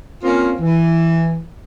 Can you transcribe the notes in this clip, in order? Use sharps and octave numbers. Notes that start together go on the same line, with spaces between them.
A#3 C4 C#4 F4
E3